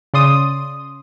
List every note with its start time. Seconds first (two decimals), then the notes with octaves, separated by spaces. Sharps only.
0.14 C#3 D5 C6 D#6 D#7